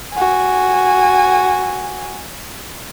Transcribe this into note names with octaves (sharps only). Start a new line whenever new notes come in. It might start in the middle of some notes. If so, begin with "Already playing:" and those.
F#4 G#5